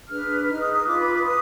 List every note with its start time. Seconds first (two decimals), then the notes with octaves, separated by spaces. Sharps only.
0.08 D4 G#4 B4 F6
0.47 D#4 G#4 B4 F6
0.60 D#6
0.73 D#6
0.86 F4 B4 D6
0.99 B5
1.12 D6
1.24 B4 D#6